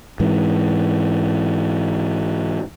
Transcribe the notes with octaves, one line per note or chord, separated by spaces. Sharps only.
G#2 E3